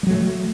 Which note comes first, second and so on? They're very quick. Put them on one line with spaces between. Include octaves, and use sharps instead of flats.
G3 F#3 A3